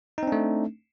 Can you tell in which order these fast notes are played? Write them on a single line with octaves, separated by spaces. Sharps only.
D#4 C4 D4 A3